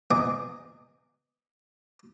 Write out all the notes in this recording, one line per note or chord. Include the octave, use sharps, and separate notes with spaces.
E2 D#5 G#5 D6 D#6